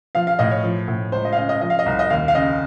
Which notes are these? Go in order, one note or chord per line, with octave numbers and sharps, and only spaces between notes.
F3 F5
F5
A2 D#5
C#5
F3
A2
C#2 C5
D#5
F5
C#3 D#5
D#5
F3 D#5
F5
D#5
C2
D#5
D#2 F5
F5
C#3 D#5